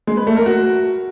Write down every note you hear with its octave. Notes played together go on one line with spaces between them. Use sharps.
G#3
B4
A3
A#4
F#4